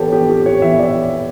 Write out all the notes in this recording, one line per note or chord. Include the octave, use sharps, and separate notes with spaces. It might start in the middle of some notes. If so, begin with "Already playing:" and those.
Already playing: E3 B3 G4 A4 C#5
E3 B3 G4
G4
C#5
E3 B3 E5
D5